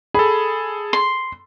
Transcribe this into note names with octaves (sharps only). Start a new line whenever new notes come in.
G#4 A4 B5
C6